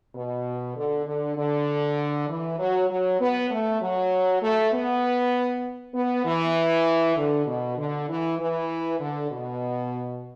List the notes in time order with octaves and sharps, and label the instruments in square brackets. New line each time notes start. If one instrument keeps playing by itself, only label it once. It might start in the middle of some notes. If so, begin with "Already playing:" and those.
[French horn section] B2
D3
D3
D3
E3
F#3
F#3
B3
A3
F#3
A3
B3
B3
E3
D3
B2
D3
E3
E3
D3
B2